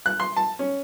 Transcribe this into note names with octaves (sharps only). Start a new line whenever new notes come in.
F#6
C6
A5
C#4